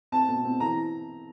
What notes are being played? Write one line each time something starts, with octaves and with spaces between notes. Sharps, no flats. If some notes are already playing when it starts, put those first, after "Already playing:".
C4 A5
B2
C4
E3 A#5